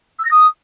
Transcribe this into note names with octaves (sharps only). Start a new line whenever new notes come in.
E6
A#6
D#6